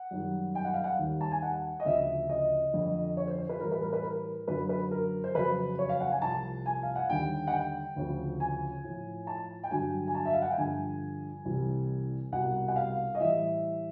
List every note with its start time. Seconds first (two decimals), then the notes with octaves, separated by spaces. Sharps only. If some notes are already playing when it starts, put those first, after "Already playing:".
Already playing: F#5
0.11 F#2 D#3 G3
0.55 G5
0.65 F#5
0.74 F5
0.84 F#5
0.99 D#2 D#3 G3
1.21 A5
1.31 G#5
1.42 F#5
1.80 D#5
1.86 D2 C#3 F3 E5
2.29 D#5
2.73 F2 D3 F3
3.17 C#5
3.27 C5
3.38 C5
3.49 B4
3.60 A2 E3 G3 A#4
3.71 B4
3.82 A#4
3.93 B4
4.03 A#4
4.47 F#2 D3 F#3 B4
4.69 B4
4.91 A#4
5.24 C5
5.35 F2 C#3 F#3 B4
5.79 C#5
5.89 F5
6.00 F#5
6.11 G#5
6.22 C2 C3 F3 A5
6.66 G#5
6.83 F5
6.96 F#5
7.09 D#2 D3 G3 G5
7.47 F#5
7.52 G5
7.96 D2 C#3 F3
8.40 G#5
8.84 A2 F3
9.27 A5
9.64 G5
9.71 G2 D3 F#3 G#5
10.07 G#5
10.15 A5
10.25 E5
10.33 F5
10.42 F#5
10.50 G5
10.58 G2 D3 F3 G#5
11.45 C2 C3 E3 G3
12.32 C2 B2 G3 F#5
12.68 F#5
12.76 F5
13.15 D#5
13.20 A2 E3 G3 E5